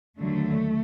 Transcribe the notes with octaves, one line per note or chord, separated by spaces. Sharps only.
D#2 D3 F#3 A3